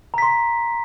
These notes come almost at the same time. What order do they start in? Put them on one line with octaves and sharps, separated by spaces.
A#5 B6 C6